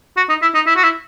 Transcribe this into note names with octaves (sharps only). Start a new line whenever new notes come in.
F#4
D#4
E4
D#4
E4
F#4
E4